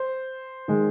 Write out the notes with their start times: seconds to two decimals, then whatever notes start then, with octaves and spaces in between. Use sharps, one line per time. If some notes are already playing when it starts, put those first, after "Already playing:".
Already playing: C5
0.68 D#3 G#3